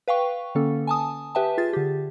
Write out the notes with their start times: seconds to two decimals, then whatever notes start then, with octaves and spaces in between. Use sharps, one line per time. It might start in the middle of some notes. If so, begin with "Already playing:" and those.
0.08 B4 F5 G5 C#6
0.55 D3 A#3 C#4 A4
0.87 G#5 A5 D#6
1.35 G4 B4 E5 G5 A5
1.58 F4 G#4 A6
1.73 D3 G4